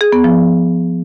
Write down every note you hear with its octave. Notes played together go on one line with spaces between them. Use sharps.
G#4
B3
F3